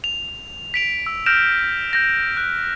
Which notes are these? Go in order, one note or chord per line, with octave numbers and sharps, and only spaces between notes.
F7
B6 D7 F7
E6
F6 G6 A#6 D7 E7 F7
G6 A#6
F#6